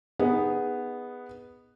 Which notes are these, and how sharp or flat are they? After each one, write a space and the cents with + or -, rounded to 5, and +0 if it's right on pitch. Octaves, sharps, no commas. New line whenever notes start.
B3 +0 D#4 +0 G#4 -15